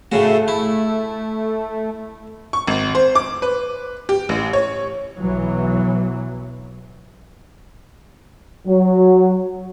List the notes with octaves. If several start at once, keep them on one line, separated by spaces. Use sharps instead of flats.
A2 C#3 A3 F#4
E4
C#6
G#1
C5
D6
B4
G4
A1
C#5
B1 E3 F#3
F#3